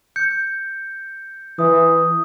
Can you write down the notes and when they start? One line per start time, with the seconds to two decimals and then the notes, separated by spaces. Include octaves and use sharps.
0.16 G6 C#7
1.59 E3 D#6